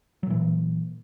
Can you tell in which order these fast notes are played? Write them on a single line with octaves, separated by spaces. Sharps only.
F#3 A#2 E3